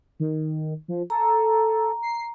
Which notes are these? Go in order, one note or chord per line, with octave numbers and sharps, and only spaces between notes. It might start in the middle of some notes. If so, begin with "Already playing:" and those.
D#3
F3
A4 A#5
C7